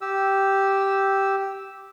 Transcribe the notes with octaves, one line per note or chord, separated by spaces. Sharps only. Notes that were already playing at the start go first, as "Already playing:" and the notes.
G4 E6